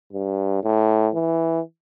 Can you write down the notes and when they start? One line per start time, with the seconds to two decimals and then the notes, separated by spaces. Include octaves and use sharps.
0.13 G2
0.63 A2
1.14 E3